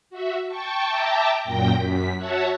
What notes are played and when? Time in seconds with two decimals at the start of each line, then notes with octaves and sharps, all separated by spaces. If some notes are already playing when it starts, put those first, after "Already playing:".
0.10 F#4 E5
0.46 G5 A5 C#6
0.89 E5 G5 A5 A#5 D6
1.43 F#2 A#2 G5 G6 A#6
1.76 F#2 B6
2.16 F#4 C#5 E5 F#5 A5